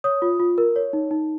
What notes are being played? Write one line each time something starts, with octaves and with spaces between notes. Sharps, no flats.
C#5 D#6
F4
F4
A#4
C#5
D#4
D#4